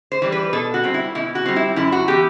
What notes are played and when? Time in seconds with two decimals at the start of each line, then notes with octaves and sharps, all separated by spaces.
0.12 C5
0.22 E3 G3
0.32 B4
0.53 B2 A4
0.74 F#4
0.84 G3 C4
0.94 E4
1.15 B2 E4
1.35 F#4
1.46 G3 C4
1.56 E4
1.76 F#2 E4
1.92 F#4
2.08 E3 B3 G4